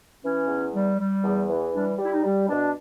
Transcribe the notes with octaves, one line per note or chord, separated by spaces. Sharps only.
E3 C#4
E2
G3
G3
E2
E3
G3 D4
G3
E4
D#4
G3
B2 D4